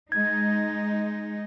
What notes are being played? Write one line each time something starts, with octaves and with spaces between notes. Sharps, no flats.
G#3 D#4 G#6